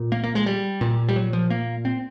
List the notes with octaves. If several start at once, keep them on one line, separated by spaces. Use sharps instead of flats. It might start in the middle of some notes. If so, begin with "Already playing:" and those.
Already playing: A#2
A#3
A#3
G#3
G3
A#2
G3
F#3
F3
A#3
C4